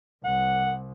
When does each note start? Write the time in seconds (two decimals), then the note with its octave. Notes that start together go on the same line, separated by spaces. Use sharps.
0.24 C2 F#5